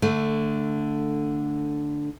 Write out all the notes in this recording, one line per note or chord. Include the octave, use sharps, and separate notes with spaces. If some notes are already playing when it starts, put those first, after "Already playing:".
D3 A3